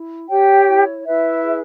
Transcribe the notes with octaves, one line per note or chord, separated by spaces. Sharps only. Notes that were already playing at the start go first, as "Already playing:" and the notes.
Already playing: E4
G4 C#5 G5
E4
E4 B4 E5
G#4